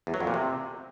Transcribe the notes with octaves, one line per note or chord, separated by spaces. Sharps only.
E2
F#3
F2
A#2
C3